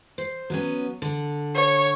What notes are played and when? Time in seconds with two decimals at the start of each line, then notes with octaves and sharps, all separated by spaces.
0.18 C5
0.50 F#3 B3 C#4
1.02 D3
1.55 C#5